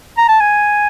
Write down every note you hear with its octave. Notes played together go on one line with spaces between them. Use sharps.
A#5
A5
G#5